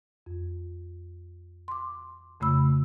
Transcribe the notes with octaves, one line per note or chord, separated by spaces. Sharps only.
F2
C6 D6
F2 C#3 A3 B5 E6